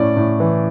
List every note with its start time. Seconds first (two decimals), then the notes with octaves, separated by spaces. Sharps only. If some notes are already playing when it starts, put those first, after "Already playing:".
Already playing: A2 C#4 D5
0.17 A2
0.40 E3